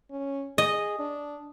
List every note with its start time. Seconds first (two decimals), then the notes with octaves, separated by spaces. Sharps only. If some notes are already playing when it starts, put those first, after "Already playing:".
0.11 C#4
0.58 G#4 D#5
0.99 D4